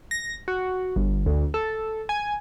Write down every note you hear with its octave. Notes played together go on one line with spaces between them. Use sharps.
A#6
F#4
G1
D2
A4
G#5